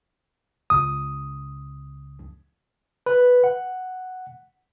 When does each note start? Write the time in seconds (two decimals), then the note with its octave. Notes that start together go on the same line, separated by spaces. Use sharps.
0.70 C#2 D#6
3.06 B4
3.44 F#5